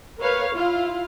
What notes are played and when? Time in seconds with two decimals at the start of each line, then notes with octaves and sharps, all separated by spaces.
0.19 A#4 B4 C#5 F5
0.54 E4 F4 F5